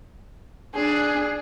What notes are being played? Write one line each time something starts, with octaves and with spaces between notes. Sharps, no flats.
D4 G#4